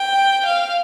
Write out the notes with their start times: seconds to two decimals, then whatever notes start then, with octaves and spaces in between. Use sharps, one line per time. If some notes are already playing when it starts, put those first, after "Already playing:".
Already playing: G5
0.46 F5